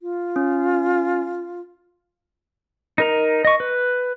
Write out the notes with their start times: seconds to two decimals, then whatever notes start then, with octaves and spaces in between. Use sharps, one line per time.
0.01 F4
0.36 C#4
2.98 D#4 A#4 A#5
3.45 D#5 C#6
3.60 B4